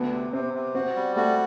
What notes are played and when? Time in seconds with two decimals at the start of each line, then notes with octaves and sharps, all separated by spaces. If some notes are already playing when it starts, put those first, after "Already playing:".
Already playing: D2 B3
0.12 C3
0.33 C3 C4
0.54 C3
0.75 C4 F#4
0.95 G3
1.16 A3 F#4